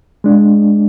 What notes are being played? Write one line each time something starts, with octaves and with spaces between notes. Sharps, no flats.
G#3 D4